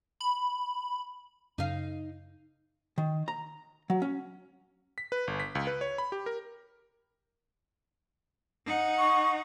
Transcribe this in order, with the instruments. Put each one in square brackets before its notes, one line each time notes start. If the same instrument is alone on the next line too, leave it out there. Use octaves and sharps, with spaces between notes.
[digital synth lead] B5
[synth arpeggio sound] F#2 C#3 [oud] D#4 F5
[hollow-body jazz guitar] D#3
A#5
F#3
C#4
[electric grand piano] B6
B4
G1
B6
C#2
B4
C#5
B5
G4
A#4
[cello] D#4 F#5
[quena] C#6